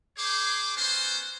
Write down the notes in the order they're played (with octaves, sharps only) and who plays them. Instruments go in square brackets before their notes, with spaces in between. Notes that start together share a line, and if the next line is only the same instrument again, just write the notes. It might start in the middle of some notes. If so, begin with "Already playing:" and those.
[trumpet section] G#4 C5 C#5 D6
B3 C#4 F#4 C5